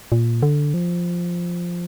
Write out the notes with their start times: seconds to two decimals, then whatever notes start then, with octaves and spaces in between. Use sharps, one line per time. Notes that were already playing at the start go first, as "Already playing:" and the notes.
0.12 A#2
0.43 D3
0.74 F3